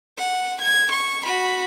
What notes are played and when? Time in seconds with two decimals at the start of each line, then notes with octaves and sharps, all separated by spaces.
0.18 F#5
0.62 G#6
0.92 C#6
1.25 F#4 B5